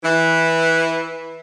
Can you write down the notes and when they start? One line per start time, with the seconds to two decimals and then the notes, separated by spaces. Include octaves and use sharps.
0.04 E3